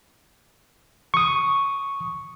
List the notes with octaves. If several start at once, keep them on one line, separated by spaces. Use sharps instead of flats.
C#6 D#6